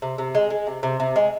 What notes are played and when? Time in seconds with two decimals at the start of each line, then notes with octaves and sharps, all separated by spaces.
0.02 C3
0.18 C3
0.35 G#3
0.50 G#3
0.67 C3
0.83 C3
1.00 C3
1.16 G#3